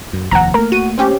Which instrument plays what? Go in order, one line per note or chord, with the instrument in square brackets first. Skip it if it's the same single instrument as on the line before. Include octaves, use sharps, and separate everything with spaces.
[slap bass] F#2
[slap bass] F1 D#2 F3 [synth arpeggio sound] F#5 A#5
[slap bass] A3 A#3 [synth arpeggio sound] A#4
[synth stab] F#4 [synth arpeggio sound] D#7
[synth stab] C4 C#4 G4